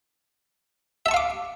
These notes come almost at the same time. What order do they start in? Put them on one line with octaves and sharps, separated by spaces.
E5 A5 C#6 F5 D6